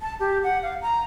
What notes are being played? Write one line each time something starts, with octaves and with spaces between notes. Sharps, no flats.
A5
G4
F#5
F5
A#5